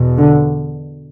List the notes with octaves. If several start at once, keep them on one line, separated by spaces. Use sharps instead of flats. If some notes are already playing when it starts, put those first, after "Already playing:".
Already playing: E2 B2
D3